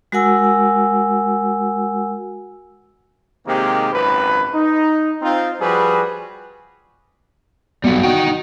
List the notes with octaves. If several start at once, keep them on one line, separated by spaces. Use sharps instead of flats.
G#3 F#4 A#4 F#5 G#5 E6
C3 D#3 G#3 A#3 C4 G4
G#1 C#2 F#2 B4
D#4
C4 D#4 F4
F3 G3 F#4 G#4 B4
B1 G3 B3
D#4 F#4 G5